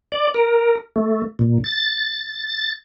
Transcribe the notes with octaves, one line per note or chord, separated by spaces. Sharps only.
D5
A#4
A3
A#2
A6